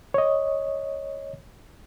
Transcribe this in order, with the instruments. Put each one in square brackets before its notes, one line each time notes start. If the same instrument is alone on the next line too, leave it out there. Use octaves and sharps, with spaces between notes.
[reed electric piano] C#5 D#5